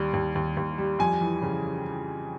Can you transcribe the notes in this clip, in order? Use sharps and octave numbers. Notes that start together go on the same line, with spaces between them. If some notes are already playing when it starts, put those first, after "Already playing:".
Already playing: D#2 G3
D#2
D#2
D#2
G3
F2 G#5
E3
C#3